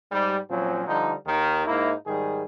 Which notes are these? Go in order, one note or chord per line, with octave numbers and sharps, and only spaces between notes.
G#2 G3
A#2 F3 F#3 C4 C#4
D3 F3 G3 D#4
D#2 D#3
G#2 A#3 D#4 E4
G#2 D#3 G3 G#4